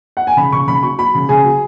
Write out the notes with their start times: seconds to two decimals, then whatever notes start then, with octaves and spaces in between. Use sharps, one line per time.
0.17 F#5
0.27 G#5
0.37 C#3 B5
0.52 C#3 C#6
0.67 C#3 B5
0.83 F#3 C#6
0.98 F#3 B5
1.15 C#3
1.29 C#3 G#4
1.44 F#3